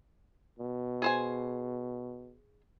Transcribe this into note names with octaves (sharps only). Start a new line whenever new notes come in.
B2
G#4 C5 G#5